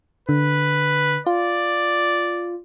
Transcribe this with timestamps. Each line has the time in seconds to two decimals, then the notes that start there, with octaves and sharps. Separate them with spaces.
0.29 D3 B4
1.27 F4 D5